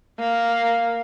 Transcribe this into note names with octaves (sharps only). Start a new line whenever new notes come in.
A#3